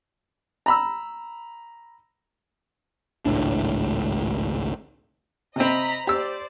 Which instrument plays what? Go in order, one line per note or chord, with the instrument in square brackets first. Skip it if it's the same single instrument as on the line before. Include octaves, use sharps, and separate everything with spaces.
[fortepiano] A#5 B5 E6
[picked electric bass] G#1 C#2 A2 D4
[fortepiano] C3 C4 [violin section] D#5 A#5 B5
[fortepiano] G4 E6 [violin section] C5 D5